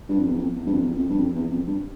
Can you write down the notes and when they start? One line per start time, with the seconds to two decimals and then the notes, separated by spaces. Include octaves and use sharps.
0.09 G2
0.18 F2
0.28 E2
0.38 F2
0.56 E2
0.66 G2
0.72 F2
0.80 E2
0.88 F2
0.98 F2
1.09 G2
1.19 F2
1.35 E2
1.51 F2
1.66 G2